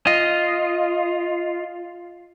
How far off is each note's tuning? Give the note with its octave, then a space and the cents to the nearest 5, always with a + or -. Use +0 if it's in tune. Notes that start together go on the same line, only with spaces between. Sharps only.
F4 -5 D#5 +0